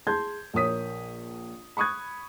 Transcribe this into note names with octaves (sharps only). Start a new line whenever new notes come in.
G#4 A5 C6 G6 G#6
A#1 A#4 C#5 D#6 B6
B5 C#6 D#6 F#6 G#6